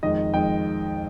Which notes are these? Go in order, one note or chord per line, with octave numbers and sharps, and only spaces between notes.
F2 D#3 G#3 D#5
F2 D#3 G#3 G5